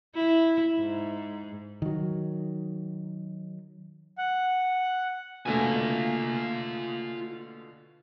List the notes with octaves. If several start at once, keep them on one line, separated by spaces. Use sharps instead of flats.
E4
G#2
D#3 F#3
F#5
B2 D3 A3 A#3 F4 G#5